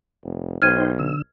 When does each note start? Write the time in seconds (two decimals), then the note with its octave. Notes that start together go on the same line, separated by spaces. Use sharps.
0.24 F1
0.62 B1 D#4 C5 G5 F6 G#6 D#7
0.99 D3 E6